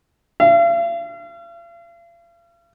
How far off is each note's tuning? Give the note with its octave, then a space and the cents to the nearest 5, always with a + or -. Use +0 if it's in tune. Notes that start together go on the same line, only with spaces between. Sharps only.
F5 -45